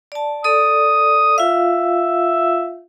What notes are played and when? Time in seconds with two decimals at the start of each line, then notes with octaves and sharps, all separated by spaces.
0.12 D5 A5
0.44 A4 D5 D#6
1.38 F4 E5 F5